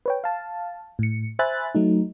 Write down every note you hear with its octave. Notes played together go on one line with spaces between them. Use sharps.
B4 C#5 G5
F5 A5
A2 C#7
C5 E5 G#5 B5 F#6 A6
F#3 A3 D#4